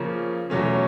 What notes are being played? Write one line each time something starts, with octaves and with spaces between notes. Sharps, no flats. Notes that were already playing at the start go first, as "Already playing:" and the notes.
Already playing: C#3 F3 A#3 C#4
E2 B2 F#3 A3 C#4